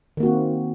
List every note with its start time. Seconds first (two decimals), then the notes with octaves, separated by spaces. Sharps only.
0.17 D#3
0.20 A#3
0.23 F#4
0.26 C4